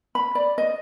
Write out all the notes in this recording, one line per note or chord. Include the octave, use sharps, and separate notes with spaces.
B5
D5
D#5